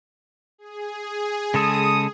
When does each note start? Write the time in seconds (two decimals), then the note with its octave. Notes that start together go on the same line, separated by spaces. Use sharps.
0.58 G#4
1.54 C#3 G#3 A4 D#6